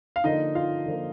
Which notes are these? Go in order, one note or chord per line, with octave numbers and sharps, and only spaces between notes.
F5
D3 F3 A#3 D#4 D#5
F4 F5
D3 F3 A#3